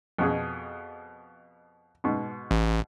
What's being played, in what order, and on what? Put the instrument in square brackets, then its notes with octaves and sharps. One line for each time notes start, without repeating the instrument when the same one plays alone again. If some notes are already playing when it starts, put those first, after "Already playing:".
[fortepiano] F2 B2 G#4
G#2 B2
[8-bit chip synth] A1